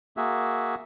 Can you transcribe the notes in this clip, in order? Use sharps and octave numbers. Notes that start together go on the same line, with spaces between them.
A#3 F#4 G#4 E5